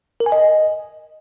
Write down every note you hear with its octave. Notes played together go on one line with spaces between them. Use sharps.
A#4
G#5
D#5